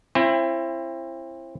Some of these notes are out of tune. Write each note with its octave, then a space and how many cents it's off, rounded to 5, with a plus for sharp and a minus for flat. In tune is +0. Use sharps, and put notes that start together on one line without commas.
C4 +30 E4 +30 G#5 -45